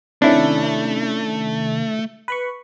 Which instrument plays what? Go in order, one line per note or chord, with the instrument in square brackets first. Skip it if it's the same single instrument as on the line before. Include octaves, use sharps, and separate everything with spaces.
[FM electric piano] C3 D#3 C#4 [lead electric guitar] A3 [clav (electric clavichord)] D4 E4
[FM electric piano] B4 B5 C#6